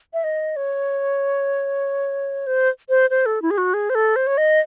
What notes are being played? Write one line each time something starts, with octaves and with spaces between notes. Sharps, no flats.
E5
D#5
C#5
C5
C5
C5
A4
E4
G#4
F#4
G#4
C5
A4
C5
C#5
D#5